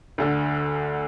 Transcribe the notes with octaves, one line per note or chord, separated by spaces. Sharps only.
D2 D3